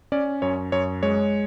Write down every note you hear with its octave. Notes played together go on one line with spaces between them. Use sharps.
C#4 D5
F#2 C#5
F#2 C#5
G#3 C#5